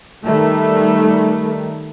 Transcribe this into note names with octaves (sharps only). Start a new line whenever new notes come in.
D#3 G3 A3